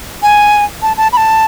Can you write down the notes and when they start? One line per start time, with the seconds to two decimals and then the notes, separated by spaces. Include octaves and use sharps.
0.22 G#5
0.82 A5
0.97 A5
1.13 B5
1.17 A5